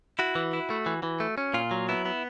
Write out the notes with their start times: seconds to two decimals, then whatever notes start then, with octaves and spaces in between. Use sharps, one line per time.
0.19 E4 F#4
0.35 E3
0.53 E4
0.70 A3
0.86 E3
1.03 E3
1.20 A3
1.38 C#4
1.54 A#2 F4
1.71 F#3
1.89 B3 E4
2.05 B3